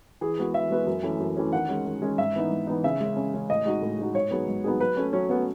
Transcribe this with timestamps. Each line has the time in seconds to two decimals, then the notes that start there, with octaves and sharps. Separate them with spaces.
0.21 E3 G#4
0.39 G#3 B3 F#4 B4
0.54 E3 E5
0.70 G#3 B3 F#4 B4
0.87 F#2
1.03 E3 A3 C#4
1.20 F#2
1.37 E3 A3 C#4
1.52 D#3 F#5
1.69 G#3 C#4
1.85 D#3
2.02 G#3 C#4
2.18 G#2 E5
2.35 E3 B3 D#4
2.51 G#2
2.67 E3 B3 D#4
2.84 C#3 E5
3.00 G#3 C#4
3.17 C#3
3.34 G#3 C#4
3.49 A2 D#5
3.65 G#3 D#4 F#4
3.82 A2
3.98 G#3 D#4 F#4
4.14 G#2 C#5
4.31 F#3 B3 D#4 G#4
4.48 G#2
4.64 F#3 B3 D#4 G#4
4.80 F#3 B4
4.97 A3 C#4
5.13 F#3 C#4
5.29 A3 B3 C#4